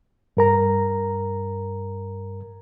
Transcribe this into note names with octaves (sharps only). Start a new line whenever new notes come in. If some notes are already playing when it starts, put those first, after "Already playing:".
G2 A#4 A#5